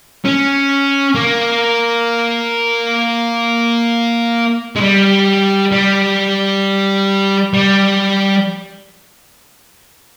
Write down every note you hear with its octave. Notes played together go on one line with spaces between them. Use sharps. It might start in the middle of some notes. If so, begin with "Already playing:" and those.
C#4
A#3
G#3
G3
G3
G3